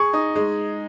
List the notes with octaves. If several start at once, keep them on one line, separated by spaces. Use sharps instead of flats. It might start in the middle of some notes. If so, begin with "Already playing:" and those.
Already playing: G#4 C#6
D#4
G#3